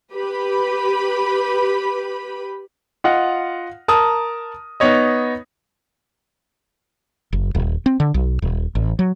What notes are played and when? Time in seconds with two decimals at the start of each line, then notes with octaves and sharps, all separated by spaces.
0.13 G4 B4 B5
3.04 F4 D#5 F5 F#5
3.88 A#4 A5 A#5 D#6
4.80 B3 D#4 C#5 D#5
7.33 F#1
7.55 D#1
7.86 C4
8.00 D3
8.14 B1
8.42 D#1
8.75 A1
8.99 F#3